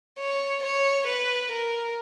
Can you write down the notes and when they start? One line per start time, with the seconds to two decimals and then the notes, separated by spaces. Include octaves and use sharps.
0.18 C#5
0.63 C#5
1.07 B4
1.51 A#4